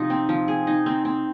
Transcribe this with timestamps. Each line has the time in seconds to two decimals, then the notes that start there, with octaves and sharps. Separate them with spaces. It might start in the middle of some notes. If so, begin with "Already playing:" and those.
Already playing: C3 F3 D#4
0.10 C4
0.29 F3
0.48 G#4
0.67 D#4
0.86 C4
1.05 C4